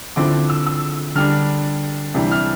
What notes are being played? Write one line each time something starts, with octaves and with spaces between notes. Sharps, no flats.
D3 F3 C4 E4 D6
E6
E6
D3 G3 D4 F6
C3 E3 G3 D4
F6